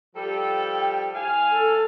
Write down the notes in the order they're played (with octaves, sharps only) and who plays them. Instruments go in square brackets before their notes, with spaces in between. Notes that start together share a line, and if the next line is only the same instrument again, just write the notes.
[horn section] F3 G3 A4 [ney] G5
[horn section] A2 F5 G#5
[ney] A4